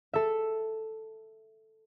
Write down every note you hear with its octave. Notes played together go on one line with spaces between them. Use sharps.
A4 E5